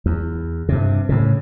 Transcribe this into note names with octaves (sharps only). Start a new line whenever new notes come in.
E2
G2 C3
A2 C#3